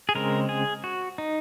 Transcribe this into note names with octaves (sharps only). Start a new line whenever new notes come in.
G#4
C#3 G#3 C4 A#4
G#4
F#4
D#4